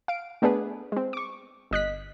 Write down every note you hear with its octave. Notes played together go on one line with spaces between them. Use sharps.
F5 D7
A3 B3 D4 G#4 B4
G#3 C4
C#6 D6
G1 D#5 F#6 B6